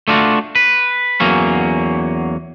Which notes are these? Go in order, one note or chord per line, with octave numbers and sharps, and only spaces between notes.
A3 D4 F4 F#4
B4
E2 F#3 A#3 C#4